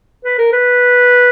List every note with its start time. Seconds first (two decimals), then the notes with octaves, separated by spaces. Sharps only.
0.25 B4
0.38 A#4
0.52 B4